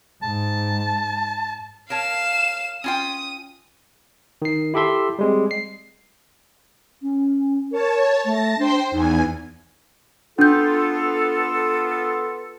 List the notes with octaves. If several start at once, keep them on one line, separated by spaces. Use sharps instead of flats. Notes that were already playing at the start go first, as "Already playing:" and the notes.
G#2 A5
A#4 C#5 F5 A5 E7
C#4 F4 G5 D#6
D#3 C7
E4 G4 A4 E5 C6
G3 G#3 C4
C7
C#4
A#4 C#5 A5
A3 A5 A#6
D4 C5 G5 C6
E2 D#4 G#5
B3 D4 F4 A4 G6